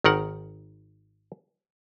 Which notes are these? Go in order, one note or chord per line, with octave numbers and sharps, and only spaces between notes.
G#1 D#3 A#4 F#5